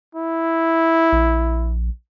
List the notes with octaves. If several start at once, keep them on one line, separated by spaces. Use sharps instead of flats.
E4
A#1